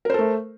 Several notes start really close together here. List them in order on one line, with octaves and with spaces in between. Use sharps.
A#4 C5 A4 A3